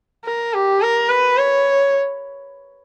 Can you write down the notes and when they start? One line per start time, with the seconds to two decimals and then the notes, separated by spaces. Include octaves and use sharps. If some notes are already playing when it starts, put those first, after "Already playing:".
0.25 A#4
0.53 G4
0.81 A#4
1.09 B4
1.38 C#5